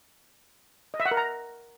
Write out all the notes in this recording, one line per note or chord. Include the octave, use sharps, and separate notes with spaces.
D#5
E5
F#5
A#4
A#5